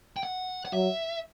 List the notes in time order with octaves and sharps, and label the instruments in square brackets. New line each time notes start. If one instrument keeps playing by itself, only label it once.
[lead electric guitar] G5
F#5
F#5
[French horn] F#3 [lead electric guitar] E5